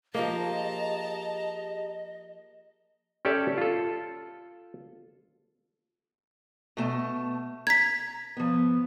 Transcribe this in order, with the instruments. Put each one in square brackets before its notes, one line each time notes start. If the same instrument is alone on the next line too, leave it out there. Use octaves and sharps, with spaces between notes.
[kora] F3 A#3 [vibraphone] G4 G#4 [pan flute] D#5 [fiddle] A5 A#5
[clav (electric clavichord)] C#4 G4 A4 D5 E5
F4 A4
[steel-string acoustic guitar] B2 A3 A5
[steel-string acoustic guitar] A#5 [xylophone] G#6 B6
[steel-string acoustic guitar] F3 B3